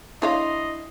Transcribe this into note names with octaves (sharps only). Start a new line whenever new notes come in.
D4 E4 C#5 D#5 F5 A#5 C6